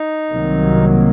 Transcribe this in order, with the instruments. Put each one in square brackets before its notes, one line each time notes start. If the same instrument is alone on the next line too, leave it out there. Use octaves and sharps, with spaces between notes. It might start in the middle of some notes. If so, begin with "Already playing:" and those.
Already playing: [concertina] D#4
[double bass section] C2 C3 D#3 F#3 A#3